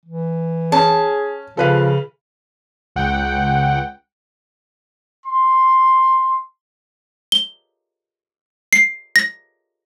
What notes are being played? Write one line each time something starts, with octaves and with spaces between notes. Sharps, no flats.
E3
C#4 G#4 A5
C#3 F3 A4 B4 F5
C#2 F#5 G5
C6
G7
C7
A#6